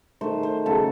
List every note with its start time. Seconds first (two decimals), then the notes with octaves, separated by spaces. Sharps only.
0.21 D#3 A3 C5
0.43 C5
0.66 C#3 F#3 A3 A4